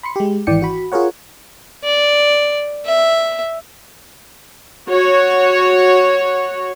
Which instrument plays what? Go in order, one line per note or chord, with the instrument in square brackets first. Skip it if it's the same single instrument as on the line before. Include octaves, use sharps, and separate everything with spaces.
[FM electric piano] B5 C6 C#7
G#3 G4
G#1 E3 D5 G5 C#7
F#4 B5
F4 G#4 A#4 C#5 F#5
[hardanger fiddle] D5
E5
[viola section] F#4 C#5